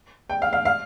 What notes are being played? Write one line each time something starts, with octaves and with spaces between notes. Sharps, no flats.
G5
F5
F5
F5